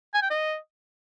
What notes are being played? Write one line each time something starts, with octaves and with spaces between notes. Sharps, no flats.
G#5
G5
D#5